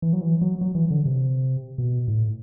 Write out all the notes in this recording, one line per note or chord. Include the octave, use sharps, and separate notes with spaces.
E3
F#3
E3
F#3
F#3
E3
D3
C3
B2
A2